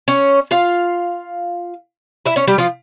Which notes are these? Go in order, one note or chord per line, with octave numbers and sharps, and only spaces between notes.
C#4 C#5
F4 F5
E4 E5
C#4 C#5
G3 G4
F3 F4